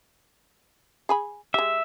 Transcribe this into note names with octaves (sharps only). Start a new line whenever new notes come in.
G#4 G#5 B5
G#3 G4 E5